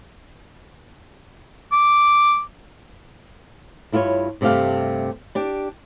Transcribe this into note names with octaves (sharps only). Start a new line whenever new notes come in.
D6
G2 E4 F4 G#4 C#5
G2 C3 A3 G4 F5
D4 G4